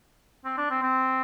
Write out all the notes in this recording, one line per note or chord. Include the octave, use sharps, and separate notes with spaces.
C4
D4
C4
C4